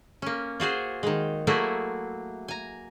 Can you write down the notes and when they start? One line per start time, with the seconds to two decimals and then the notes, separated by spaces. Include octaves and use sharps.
0.22 A#3 C#4
0.60 F4 F#4 G#4 C5
1.03 D#3 G#3
1.47 F#3 A3 A#3 E4 F#4 G#4
2.48 G#5 A#5